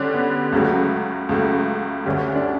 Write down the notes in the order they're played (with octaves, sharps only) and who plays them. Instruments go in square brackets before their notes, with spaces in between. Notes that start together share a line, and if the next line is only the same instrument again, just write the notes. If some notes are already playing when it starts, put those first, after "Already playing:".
Already playing: [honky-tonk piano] D3 G3 D4 [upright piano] C#4
[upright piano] B3
[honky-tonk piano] C#2 C#3 F#3 A3
C#2 C#3 F#3 A3
[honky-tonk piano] D2 D3 G3 [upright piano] C#4
[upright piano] D4